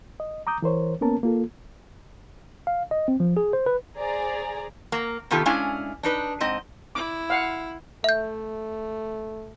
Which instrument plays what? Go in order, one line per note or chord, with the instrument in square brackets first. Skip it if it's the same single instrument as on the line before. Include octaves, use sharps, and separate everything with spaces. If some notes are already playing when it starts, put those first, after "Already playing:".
[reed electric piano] D#5
A#5 D6 D#6 G6
E3 A#4 C5 C#5
A#3 B3 C#4 A#4 A5
A#3 F4 A4
[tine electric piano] F5
D#5
C4
F3
G#4
C5
B4
[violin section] G#4 C5 D5 G#5 A#5
[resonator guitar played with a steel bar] A#3
C3 D#3 B3 F4 G4 A4
G#3 C#4 D4 E4 F5 G#5
D4 D#4 B4
G#2 C4 D#5
[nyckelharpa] E4 [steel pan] D6
[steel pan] F5 F#5
[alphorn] A3 [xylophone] E5 G6